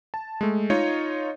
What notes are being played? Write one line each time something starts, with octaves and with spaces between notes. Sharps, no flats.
A5
G#3 A3
D#4 F4 C#5 D#5